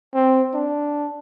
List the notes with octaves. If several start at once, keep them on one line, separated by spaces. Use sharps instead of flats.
C4
D4